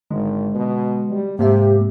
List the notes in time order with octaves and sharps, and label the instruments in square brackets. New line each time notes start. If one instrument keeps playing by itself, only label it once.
[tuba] G#1 [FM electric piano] D3 [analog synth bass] G#3
[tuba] B2
G3
[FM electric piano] G#2 G#3 E5 [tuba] C3 [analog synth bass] A#3 [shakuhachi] G4